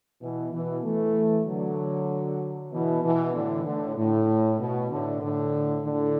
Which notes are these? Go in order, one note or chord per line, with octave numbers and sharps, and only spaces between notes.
B2 E3
B2 E3
E3 A3
D3 F#3
B2 E3
B2 E3
A2 D3
A2 D3
A2
B2
A2 D3
A2 D3
A2 D3